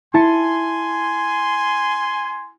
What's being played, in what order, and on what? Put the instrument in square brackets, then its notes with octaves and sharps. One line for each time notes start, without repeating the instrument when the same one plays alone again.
[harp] E4 A5 C#7 [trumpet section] G#5 C6